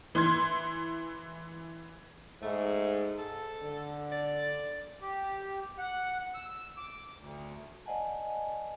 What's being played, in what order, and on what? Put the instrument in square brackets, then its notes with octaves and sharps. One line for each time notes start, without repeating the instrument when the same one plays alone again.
[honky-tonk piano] E3 C6 G#6
[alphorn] G#2 [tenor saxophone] A3
[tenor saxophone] A4
[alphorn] D3
[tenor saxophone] D5
[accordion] G4
F#5
E6
D6
D2
[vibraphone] C5 D5 D#5 F#5 G#5 A5